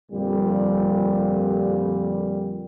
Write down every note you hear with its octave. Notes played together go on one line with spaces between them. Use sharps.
F2 A#2 D3 G3